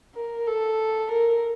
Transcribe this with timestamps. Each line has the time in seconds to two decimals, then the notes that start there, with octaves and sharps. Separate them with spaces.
0.15 A#4
0.47 A4
1.12 A#4